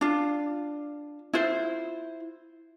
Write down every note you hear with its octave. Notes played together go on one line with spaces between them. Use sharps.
D4 F4
E4 F4 C5